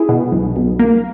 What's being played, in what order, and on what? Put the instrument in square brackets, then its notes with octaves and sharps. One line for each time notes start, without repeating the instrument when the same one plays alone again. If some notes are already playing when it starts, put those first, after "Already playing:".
Already playing: [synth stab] E4 G#4
B2
B1
B1
A#3